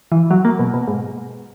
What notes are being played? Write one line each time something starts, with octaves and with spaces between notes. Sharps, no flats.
E3
F#3
A#3
B2
B2
G#2